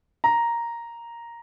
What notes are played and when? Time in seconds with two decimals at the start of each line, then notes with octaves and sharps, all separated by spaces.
0.24 A#5